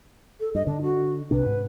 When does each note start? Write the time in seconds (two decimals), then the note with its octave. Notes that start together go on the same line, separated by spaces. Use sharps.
0.40 A4
0.55 G2 D#5
0.67 D3 D4
0.82 F#4
1.31 C2 C3 D4 B4
1.46 G#2